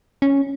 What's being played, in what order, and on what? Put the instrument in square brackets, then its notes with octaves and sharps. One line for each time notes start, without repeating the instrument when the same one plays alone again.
[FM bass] C#4